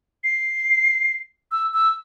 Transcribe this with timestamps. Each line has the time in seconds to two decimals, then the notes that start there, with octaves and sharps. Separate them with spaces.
0.24 C7
1.52 E6
1.73 E6